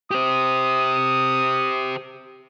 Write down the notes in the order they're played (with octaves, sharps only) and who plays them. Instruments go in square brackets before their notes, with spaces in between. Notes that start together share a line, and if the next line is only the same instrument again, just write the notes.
[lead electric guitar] G4 C5 [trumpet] D#6